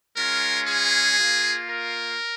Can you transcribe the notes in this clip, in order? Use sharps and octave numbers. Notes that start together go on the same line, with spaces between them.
G#3 C#4 F4 A#4
G#4
A#3 F4
A#4